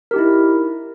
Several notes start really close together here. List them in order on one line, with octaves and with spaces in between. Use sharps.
A#4 G4 D#4 E4